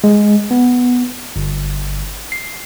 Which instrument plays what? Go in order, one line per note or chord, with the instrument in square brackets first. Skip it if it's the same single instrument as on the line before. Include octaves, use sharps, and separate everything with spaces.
[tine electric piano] G#3
B3
G1
C7